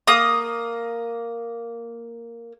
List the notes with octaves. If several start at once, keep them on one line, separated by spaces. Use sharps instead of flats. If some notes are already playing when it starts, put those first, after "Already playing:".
A#3 D#6